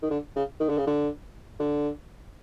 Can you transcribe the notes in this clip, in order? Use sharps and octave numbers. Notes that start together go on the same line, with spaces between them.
D#3
D3
C#3
D#3
D3
C#3
D3
D3